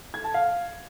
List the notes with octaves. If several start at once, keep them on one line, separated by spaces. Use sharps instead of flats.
G#6
A5
F5